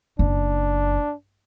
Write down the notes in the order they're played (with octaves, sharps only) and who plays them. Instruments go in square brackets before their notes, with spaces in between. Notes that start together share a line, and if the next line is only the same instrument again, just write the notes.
[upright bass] F#1 [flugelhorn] D4